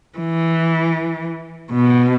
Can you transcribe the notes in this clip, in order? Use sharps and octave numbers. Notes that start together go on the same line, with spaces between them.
E3
B2